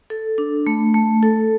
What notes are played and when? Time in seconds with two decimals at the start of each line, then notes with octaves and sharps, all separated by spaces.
0.10 A4
0.38 D4
0.67 A3
0.94 A3
1.23 A4